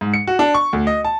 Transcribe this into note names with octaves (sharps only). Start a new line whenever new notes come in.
G#2
C#7
F#4
D4
C#6
D2
D#5
A5